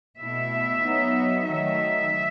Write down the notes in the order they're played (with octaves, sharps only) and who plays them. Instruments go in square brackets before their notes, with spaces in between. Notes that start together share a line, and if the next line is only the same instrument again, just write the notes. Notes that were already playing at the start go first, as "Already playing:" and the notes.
[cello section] B2 A3 E4 E5
F#3 B3 D#4
D#3 F#3 A3 D#4 E5